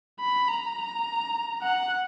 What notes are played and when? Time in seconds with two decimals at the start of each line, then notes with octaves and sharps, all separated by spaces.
0.20 B5
0.48 A#5
1.63 F#5